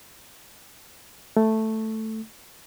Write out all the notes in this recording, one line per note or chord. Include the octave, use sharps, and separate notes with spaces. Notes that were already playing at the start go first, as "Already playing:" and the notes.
A3